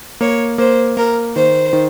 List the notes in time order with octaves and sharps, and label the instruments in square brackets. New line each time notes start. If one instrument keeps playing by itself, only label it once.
[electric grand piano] A#3 [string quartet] C#5
[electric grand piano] A#3 [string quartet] C5
[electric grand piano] A#3 [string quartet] A#4
[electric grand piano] D#3 [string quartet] C5
[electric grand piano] D#3